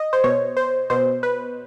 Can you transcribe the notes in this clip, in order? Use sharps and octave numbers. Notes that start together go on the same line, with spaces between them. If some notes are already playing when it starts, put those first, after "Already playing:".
Already playing: D#5
C5
B2 C#5
C5
B2 C5
B4